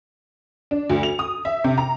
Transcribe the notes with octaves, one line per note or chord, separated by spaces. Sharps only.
D4
D2
F7
D#6
E5
C3
A#5